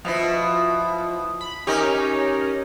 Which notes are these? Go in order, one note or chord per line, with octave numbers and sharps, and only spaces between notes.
B2 F3 E4
B5
C#4 D#4 G4 A#4